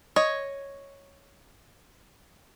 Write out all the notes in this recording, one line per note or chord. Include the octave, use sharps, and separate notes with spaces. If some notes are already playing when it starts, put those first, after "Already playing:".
C#5 D#5